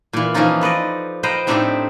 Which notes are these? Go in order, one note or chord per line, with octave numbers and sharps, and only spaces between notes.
A#2 E3
E3 F3 A#3 C#4 D#4 F4
A4 B4 D5 D#5
B4 C5 D#5 F5 G5 A#5
A2 C4 D4 D#4 G4 E5